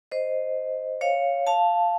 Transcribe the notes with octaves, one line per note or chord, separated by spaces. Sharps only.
C5 D#5
C#5 F5
F5 A5